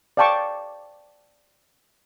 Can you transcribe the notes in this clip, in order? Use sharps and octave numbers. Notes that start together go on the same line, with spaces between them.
D5 F5 G5 A5 C#6 D6